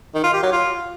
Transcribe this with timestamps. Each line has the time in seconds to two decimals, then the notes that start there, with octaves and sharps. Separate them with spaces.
0.14 D#3
0.24 F4
0.33 G4
0.43 F#3
0.52 F4